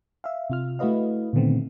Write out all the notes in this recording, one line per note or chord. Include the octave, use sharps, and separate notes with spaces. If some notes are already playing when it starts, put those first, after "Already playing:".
E5 F5
C3 F4 F6
A3 E4 F#4 B4 D#5 F5
A#2 D3 D#3 A3 B3 C4